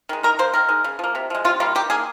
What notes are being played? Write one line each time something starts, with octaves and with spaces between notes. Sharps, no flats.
D#3 G#3
D#3 A#4
A#3 C5
D#3 A#4
G#3
C#3
F3 A#3
C3
F3 G#3
C3 F4
G3 A#3 F4
D#3 G4
A#3 G#4